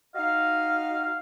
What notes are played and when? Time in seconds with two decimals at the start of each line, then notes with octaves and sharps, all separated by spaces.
0.15 D#4 F#4 D#5 F5